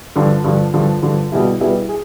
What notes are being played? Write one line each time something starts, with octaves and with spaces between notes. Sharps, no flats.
G2 D3 F3
G2 D3 F3
G2 D3 F3
G2 D3 F3
B2 G3 B3 E4 G#4
B2 G3 B3 E4 G#4
G#4